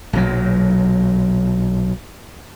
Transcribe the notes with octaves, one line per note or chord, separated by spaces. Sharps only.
B1 A#2 F#3